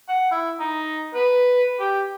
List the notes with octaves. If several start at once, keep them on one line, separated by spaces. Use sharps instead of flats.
F#5
E4
D#4
B4
G4